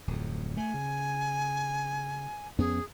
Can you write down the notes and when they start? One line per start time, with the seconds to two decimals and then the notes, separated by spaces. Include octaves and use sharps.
0.07 D1 F2
0.57 A3 G#5
0.74 C#3
2.58 F2 B3 C#4 G#4